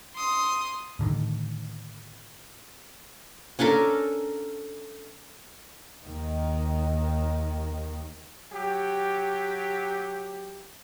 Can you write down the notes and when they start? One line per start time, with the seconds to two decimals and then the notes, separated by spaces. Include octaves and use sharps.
0.15 C6 D#6
0.99 A2 D3 D#3
3.59 C#4 D4 A4 A#4
6.05 D#2 D#3
8.53 F#3 G4